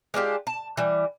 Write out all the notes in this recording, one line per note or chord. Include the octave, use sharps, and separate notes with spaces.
G#3 D4 F4 G4
A5
E3 G3